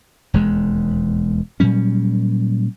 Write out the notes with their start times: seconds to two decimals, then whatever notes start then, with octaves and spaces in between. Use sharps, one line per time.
0.34 E1 D#2 G#3
1.60 A#2 F#3 G3 C#4